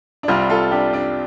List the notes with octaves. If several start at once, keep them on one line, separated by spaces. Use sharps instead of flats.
D4
C2 C3 G3 C4 F4
F4 A4
D4 G4
D4